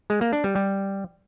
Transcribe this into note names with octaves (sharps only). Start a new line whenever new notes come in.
G#3
A#3
D4
G3
G3